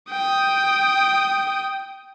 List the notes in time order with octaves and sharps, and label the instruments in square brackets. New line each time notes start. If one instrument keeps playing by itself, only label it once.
[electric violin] G5 D#6